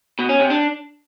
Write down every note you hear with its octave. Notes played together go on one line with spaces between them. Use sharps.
B2
C#4
C3
D4